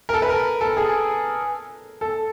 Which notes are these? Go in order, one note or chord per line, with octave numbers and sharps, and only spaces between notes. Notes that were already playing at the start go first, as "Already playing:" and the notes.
A#4
A4
B4
A#4
A4
G#4
A4